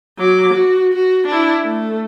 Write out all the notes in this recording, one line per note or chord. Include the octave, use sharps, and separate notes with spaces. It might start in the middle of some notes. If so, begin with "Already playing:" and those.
F#3 D6
F#4
F#4
D4 E4
A3